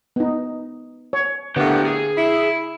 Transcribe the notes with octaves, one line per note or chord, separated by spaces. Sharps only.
B3 D#4
C#5
A2 D3 A#3 B3 G4 F#5 G5
G#4
E4